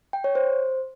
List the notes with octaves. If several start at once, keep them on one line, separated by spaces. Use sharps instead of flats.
G5
C#5
C5